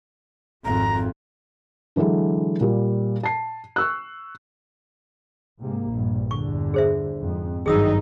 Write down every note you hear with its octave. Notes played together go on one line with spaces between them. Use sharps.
G#1 F2 A#5
D3 E3 F#3 G#3 A4
A#2 G3
A5 C7
C#6 E6 F#6
G#2 C3 A#3
A#1 G2
G1 E2 D3 C#6
G#4 C5 E5
F2 G#2
G#1 G2 D#3 F#3 D#4 G#4 D#6 E6